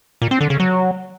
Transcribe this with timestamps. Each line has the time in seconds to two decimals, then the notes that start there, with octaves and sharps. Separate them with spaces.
0.22 A#2
0.31 C4
0.41 D3
0.50 C#3
0.60 F#3